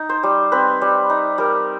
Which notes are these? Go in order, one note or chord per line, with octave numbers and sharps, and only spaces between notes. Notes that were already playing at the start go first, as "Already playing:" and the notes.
Already playing: D#4
C5
G3
C4 B4
G3
D#4
G3 A#4